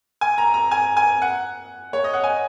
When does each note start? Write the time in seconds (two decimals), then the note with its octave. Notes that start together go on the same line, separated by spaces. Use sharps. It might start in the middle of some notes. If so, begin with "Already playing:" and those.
0.21 G#5
0.38 A#5
0.54 A#5
0.71 G#5
0.97 G#5
1.22 F#5
1.93 C#5
2.04 D#5
2.14 F#5
2.24 G#5